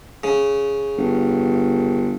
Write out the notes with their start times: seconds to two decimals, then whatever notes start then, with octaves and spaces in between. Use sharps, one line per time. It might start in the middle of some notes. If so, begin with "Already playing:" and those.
0.24 C#3
0.97 G1